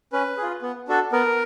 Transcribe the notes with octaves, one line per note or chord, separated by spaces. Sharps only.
C#4 B4
G#4
F4
B3
D4 F#4 A4
B3 A#4